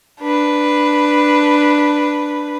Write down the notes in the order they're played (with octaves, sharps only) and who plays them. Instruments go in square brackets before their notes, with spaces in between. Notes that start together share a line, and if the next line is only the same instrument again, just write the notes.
[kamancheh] D4 B4